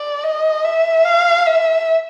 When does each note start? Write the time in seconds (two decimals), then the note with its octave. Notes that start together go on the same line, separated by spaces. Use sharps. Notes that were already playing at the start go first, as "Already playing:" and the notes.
Already playing: D5
0.24 D#5
0.64 E5
1.05 F5
1.46 E5